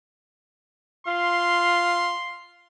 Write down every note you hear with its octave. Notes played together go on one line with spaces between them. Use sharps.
F4 C6